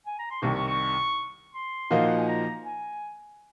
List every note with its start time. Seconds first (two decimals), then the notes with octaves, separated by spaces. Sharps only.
0.06 G#5
0.19 A#5
0.31 C6
0.42 C2 C3 D#3 C#6
0.55 C#6
0.68 C#6
1.54 C6
1.91 A#2 F3 A#3 D#4 F#4
2.07 F#5
2.17 G#5
2.28 A#5
2.65 G#5